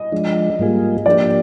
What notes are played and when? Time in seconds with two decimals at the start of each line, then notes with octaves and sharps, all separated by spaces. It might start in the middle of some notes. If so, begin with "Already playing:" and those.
Already playing: D#5
0.12 F3 G#3 D4
0.59 G#2 G3 A#3 F4 G#4
1.06 F3 A#3 D4 G4 D5